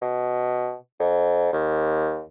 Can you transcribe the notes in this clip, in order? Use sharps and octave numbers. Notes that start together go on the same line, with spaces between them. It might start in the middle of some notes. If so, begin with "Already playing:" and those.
B2
F2
D#2